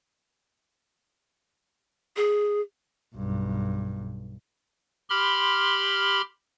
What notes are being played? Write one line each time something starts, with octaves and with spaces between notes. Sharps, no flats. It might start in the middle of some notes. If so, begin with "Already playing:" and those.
G#4
B1 G2
G4 B5 C6 F6